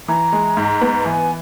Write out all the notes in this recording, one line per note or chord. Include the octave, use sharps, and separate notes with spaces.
E3 A#5
G#3
G#2
B3
E3 G#5